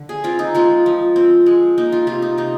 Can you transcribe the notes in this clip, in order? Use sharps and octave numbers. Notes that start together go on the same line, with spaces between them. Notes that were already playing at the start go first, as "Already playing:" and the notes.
Already playing: D3
G#4
C4 F4
D#4
G#3 F4
F3
C4
G#3
A#3 D#4
F4
C3 F4
D#4
C3 D#4